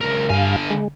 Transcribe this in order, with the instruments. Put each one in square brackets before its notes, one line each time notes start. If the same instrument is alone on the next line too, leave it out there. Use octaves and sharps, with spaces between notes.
[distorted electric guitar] C#2 A#4
[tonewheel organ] G2 F5 [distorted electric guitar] D3 G#5
[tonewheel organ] G#3